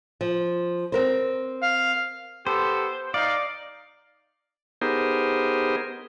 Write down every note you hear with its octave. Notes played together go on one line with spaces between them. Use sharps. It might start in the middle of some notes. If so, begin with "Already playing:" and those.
F3
C4 A#4 C5
F5
B3 G4 A4 C5
D#4 D5 F5
B3 D#4 G4 G#4 A#4 C5